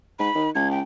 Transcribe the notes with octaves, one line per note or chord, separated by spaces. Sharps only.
G#2 B5
D#3
C#2 G#6
G5